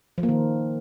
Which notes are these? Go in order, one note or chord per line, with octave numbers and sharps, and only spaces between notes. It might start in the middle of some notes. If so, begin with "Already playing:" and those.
F3
A#3
D#3